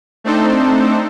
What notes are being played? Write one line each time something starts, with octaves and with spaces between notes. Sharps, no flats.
A3 C4 D4 D#4 A4 C5